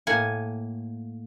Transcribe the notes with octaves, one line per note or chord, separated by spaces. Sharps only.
A2 A#3 F#5 G#5